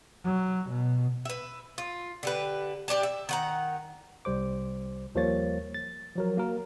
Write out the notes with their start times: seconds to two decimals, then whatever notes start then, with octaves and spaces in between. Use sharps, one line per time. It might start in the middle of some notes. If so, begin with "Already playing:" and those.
0.25 F#3
0.69 B2
1.25 B4 E5
1.78 F4
2.23 D3 G4 B4
2.88 D4 G4 D5 A5
3.03 E5
3.29 D#3 F#5 A#5
4.25 C2 G3 C5 D6
5.15 D#2 F3 G3 A#3 C#5 A6
5.74 A6
6.16 F3 F#3 A#4
6.37 A#3 F#4 A#4